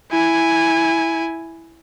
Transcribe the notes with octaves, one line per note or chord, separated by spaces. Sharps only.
E4 G#5